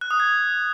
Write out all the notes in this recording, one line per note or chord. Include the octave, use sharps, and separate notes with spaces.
F#6
D#6
G#6